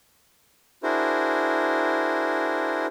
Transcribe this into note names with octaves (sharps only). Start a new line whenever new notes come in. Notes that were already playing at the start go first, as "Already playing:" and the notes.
D4 E4 F#4 G#4 A#4 C5